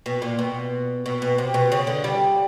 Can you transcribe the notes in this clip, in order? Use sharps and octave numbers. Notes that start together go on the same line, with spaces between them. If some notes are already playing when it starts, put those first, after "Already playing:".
B2
A#2
B2
B2
B2
C3
B2
C#3
D3
G3